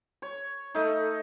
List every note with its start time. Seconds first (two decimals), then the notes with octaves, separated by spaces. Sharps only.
0.22 C#5
0.74 A3 D#4